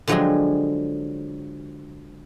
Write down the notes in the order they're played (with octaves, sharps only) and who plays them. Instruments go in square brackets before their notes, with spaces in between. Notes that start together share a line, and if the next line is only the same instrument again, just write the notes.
[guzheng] D3 F3 F#3 G#3 G4 G#4